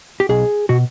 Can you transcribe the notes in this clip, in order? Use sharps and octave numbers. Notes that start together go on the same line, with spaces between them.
G4
B1 G#4
B2 F#4